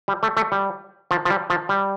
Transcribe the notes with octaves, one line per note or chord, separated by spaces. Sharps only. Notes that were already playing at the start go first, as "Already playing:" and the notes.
G3
A3
A3
G3
F3
F3
G3
F3
G3